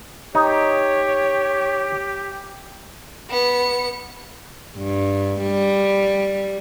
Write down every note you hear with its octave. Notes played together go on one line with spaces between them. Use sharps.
D#4 G4 C#5
B3 C#7
G2
G3